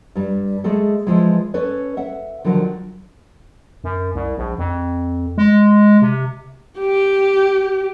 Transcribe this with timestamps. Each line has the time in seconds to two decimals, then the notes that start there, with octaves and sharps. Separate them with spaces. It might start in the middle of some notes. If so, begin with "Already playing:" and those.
0.16 G2 G3
0.64 G#3 A3 G#4 A4
1.07 E3 F3 G#3
1.54 C#4 A4 B4 C#5
1.97 E5 F#5
2.45 D3 D#3 F3 F#3
3.84 F#2
4.15 C2
4.37 A#1
4.58 F2
5.38 G#3
6.02 C3
6.79 G4